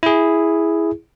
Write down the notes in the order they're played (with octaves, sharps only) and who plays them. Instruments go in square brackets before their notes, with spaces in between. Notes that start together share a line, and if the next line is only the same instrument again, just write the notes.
[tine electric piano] E4 G#4